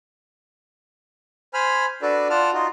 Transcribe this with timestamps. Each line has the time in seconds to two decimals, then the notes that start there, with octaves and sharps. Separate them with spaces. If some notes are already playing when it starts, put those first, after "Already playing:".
1.54 C5 G#5 B5 F6
2.02 D4 F#4 A4 B4 D5
2.30 F4 D5 F#5 A5 F6
2.53 D#4 F4 F#4